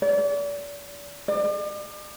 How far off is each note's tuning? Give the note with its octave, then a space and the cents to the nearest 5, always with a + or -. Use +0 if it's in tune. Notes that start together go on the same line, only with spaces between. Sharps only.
D5 -35
D5 +40